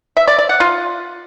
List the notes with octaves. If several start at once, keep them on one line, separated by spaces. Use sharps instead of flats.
E5
D5
D5
F#5
F4